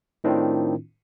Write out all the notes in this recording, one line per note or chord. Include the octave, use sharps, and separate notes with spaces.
A2 D#3 C4 D4 E4 F4